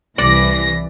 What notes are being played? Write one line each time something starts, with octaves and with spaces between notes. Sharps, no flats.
C2 E3 D5 A#6